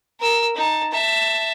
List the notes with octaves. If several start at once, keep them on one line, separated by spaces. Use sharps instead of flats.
A#4 E6
D#4 A5
E5 A5